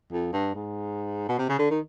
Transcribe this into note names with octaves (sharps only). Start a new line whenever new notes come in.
F2
G2
G#2
B2
C3
C#3
D3
D#3